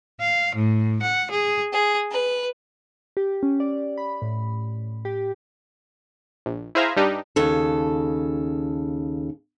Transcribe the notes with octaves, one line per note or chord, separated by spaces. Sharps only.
F5
A2
F#5
G#4
G#4
B4
G4
C#4
D5
B5
A2
G4
A#1
E4 G#4 C5 E5 F5 A#5
G2 G3 D4 D#4 G4
D#2 C#3 A4